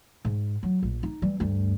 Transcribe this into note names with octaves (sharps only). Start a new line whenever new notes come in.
G#2
F#3
A#1
D#4
E3 G3
D2 G2